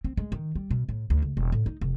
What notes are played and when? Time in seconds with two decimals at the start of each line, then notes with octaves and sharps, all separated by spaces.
0.04 C4
0.17 G#3
0.32 D#3
0.55 G3
0.71 B2
0.89 A2
1.10 D2
1.22 C#2
1.37 E1
1.52 A2
1.66 D#4
1.81 F1